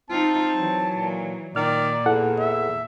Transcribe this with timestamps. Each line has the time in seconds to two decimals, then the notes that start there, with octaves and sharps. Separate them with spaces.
0.10 C4 D#4 F4 A5
0.55 E3 F#3
0.95 A#2
1.56 A#2 D#3 D5 F6
2.06 E2 E4 A4 F#5
2.39 E5